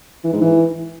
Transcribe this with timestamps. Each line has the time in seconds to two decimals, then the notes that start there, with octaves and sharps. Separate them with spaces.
0.24 E3
0.33 G#2
0.41 E3